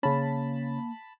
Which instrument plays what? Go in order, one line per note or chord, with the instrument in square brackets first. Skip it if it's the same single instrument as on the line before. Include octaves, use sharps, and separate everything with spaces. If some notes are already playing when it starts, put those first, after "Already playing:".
[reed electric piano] C#3 C#4 [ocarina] A#3 [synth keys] A5 B5